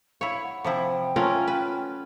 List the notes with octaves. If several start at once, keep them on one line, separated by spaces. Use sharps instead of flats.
E4 C#5 F5
F#5
C3 F3 E4
G5
F#3 A3 C#4 F4 A#4
B4